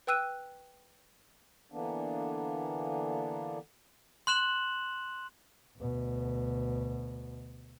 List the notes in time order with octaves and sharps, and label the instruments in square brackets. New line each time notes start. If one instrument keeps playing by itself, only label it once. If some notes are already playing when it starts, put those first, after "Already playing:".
[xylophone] B4 G5 E6 F#6 D#7
[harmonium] D3 E3 A#3 B3 D4
[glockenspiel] C6 F#6 E7 F#7
[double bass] D2 B2